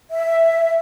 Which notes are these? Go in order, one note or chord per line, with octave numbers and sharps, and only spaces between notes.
E5